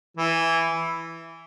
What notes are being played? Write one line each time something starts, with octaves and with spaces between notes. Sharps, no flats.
E3